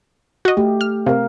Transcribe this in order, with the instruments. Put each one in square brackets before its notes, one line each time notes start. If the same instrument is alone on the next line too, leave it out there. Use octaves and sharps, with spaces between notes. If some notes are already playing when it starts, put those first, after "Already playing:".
[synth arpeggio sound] F#4 D#5
[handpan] A3 G4
[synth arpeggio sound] F6
[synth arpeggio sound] C3 [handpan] A#4 F5